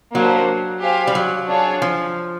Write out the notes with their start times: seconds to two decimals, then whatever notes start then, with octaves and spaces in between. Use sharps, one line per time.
0.15 F#3 A#3 D4 G4 C5
0.82 G4 C5 F5 G#5
1.07 G3
1.15 F#3
1.48 D4 F4 G#4 C#5
1.82 F3